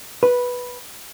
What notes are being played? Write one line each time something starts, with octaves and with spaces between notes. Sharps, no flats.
B4